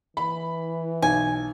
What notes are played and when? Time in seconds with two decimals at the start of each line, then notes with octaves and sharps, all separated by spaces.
0.17 E3 B5
1.02 B1 G#5